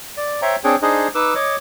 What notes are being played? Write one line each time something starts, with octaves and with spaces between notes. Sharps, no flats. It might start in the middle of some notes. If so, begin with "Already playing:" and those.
D5
C5 C#5 E5 G5 A#5
C4 D4 G#4 C#5 G5
D4 D#4 G#4 C5 D#5
D#4 B4 D6 E6
C#5 D#5 D6